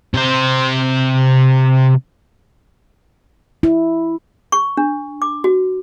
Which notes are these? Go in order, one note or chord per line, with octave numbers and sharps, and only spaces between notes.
C3 C5
E4
C#6
D4
D6
F#4